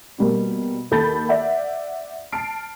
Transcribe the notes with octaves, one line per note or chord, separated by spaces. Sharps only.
B2 G3 A#3
D#2 A4 B5 G6 A6
D5 E5 F#5
A5 F6 C7 D7